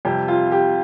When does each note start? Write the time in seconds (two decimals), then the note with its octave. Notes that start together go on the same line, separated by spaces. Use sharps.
0.05 F2 C3 G3 G4
0.28 F4
0.52 G4